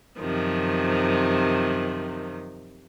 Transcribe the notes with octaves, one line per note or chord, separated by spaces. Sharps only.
F#2 C3 D#3 F3